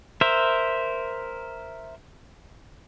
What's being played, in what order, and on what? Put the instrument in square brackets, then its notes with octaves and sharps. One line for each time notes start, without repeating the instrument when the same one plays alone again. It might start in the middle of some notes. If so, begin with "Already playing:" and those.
[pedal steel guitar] A#4 C5 E5